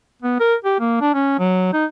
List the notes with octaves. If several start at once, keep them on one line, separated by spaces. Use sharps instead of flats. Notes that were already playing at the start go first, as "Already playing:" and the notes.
B3
A#4
G4
A#3
D4
C#4
F#3
D#4